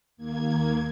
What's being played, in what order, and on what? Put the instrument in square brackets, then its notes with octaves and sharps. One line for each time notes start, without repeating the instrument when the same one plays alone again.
[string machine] D#2 A#3 G#6